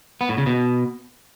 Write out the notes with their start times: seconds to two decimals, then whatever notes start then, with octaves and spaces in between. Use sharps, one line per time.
0.21 B3
0.29 A2
0.38 C#3
0.46 B2